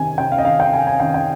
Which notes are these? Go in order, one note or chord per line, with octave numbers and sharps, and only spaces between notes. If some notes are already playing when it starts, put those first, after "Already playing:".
Already playing: C3 D#3 G#5
C3 G5
F5
D#5
D#3 F5
G5
C3 G#5
G#5
D#3 G5
G5